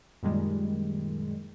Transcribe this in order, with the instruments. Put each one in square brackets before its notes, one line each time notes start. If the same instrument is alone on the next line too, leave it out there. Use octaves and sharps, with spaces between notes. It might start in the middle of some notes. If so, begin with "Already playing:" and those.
[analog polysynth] F#2 A#2 D#3 G3 G#3